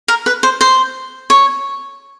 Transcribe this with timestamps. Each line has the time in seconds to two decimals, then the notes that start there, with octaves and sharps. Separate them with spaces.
0.08 A#4
0.26 B4
0.43 C5
0.61 C5
1.30 C#5